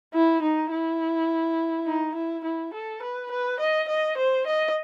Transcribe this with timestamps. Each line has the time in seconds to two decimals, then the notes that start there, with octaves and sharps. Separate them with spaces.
0.14 E4
0.42 D#4
0.71 E4
1.86 D#4
2.15 E4
2.44 E4
2.73 A4
3.02 B4
3.31 B4
3.60 D#5
3.88 D#5
4.17 C5
4.47 D#5